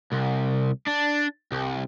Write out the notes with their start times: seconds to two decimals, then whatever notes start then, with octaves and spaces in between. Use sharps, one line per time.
0.12 C2
0.88 D4
1.52 C2